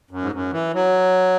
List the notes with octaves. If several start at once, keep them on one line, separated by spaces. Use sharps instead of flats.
F#2
G#2
F#2
E3
F#3